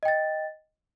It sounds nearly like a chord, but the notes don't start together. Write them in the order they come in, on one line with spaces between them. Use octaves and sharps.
D#5 G5 A6